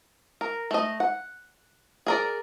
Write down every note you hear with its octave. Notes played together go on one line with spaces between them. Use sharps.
A#4
A3 D#5
F#5
G#4 A#4 D5